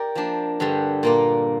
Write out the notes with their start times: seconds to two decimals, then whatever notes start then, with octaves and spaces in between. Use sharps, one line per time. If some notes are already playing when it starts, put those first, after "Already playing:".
Already playing: G4 A#4 D5
0.15 F3 A#3 D4
0.60 G2 D3 G3
1.03 A#2 A#3 F4